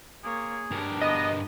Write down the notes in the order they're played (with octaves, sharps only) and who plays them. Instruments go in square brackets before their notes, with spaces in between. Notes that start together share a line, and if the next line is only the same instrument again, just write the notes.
[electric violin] A#3 C#5 [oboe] G#4
[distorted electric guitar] G2 A#4 [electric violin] D4
[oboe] B3 [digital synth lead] D#5